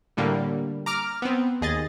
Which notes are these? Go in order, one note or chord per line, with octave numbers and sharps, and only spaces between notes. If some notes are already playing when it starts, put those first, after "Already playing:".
A2 D3 G3 A#3
A#5 D6 F6
B3 C4
D#2 G#4 D#5 A6